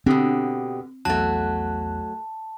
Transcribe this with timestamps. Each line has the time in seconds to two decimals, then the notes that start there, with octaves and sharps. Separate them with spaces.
0.06 B2 D3 C4 G4 G5 D#6
1.05 A#1 E2 F#3 A3 A5 F#6